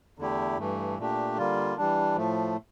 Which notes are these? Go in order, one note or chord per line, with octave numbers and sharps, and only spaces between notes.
E2 D3 A3 E4 G4
G2 E3 A3
A#2 A3 D4 G4
D3 G3 A#3 F4
E3 G3 D4
A2 F3 A3